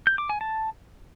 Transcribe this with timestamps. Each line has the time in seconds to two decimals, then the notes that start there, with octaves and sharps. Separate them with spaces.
0.07 G6
0.18 D6
0.29 G#5
0.41 A5